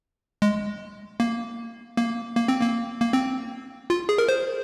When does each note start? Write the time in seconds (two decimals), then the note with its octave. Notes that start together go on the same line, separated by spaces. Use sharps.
0.42 G#3
1.20 A#3
1.97 A#3
2.35 A#3
2.48 C4
2.61 A#3
3.00 A#3
3.13 C4
3.90 F4
4.09 G#4
4.18 A#4
4.29 C5